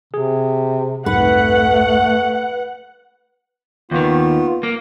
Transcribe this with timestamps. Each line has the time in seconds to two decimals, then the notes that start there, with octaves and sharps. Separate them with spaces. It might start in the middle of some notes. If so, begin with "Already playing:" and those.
0.14 C3 G#4
1.06 C2 F2 G#2 A3 B4 F#5
3.91 D#2 D#3 B3 F4
4.63 A#3